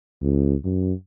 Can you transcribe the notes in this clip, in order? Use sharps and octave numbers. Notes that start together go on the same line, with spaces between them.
C#2
F#2